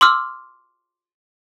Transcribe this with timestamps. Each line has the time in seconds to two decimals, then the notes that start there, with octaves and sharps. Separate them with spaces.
0.01 C6 D6 E6 F6